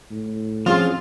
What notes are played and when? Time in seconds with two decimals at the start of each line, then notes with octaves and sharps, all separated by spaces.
0.11 A2
0.66 F3 C4 C#4 F4 G#4